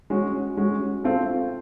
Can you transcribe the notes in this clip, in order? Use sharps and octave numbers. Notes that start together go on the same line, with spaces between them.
G#3 C#4 F#4
G#3 C#4 F#4
C4 F4 A4